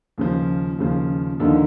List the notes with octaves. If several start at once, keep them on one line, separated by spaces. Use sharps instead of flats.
D#2 C#3 F3
D#2 C#3 F3
D#2 D3 F3 A#3 D#4